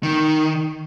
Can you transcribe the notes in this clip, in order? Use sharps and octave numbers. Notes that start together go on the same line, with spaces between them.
D#3